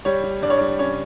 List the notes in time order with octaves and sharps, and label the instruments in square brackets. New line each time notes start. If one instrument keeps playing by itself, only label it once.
[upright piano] G3 C#5
G3
G2 D5
C#5
G3 D5
C#4 C#5